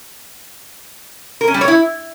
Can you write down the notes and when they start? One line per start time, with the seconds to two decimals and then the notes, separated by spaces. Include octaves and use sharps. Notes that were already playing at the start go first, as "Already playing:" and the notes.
1.41 A#4
1.48 C#4
1.54 G3
1.61 C#5
1.68 E4